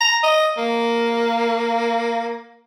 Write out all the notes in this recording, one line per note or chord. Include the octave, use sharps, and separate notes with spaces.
A#5
D#5
A#3